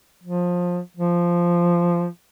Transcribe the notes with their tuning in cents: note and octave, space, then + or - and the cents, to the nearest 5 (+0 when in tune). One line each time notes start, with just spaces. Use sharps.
F3 +20
F3 -10